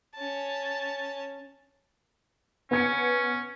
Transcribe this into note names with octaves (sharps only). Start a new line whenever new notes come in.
C#4 A5
B3 C#4 G#6 C#7